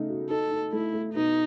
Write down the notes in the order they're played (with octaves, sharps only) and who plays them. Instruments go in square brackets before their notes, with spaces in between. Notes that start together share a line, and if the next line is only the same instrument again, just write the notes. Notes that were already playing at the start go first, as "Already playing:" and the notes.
Already playing: [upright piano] C#3 A3 D#4
F#4
[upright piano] D#4 [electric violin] A4
[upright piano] D#4
[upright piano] A3 [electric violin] E4
[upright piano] A3
[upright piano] B2 [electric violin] D#4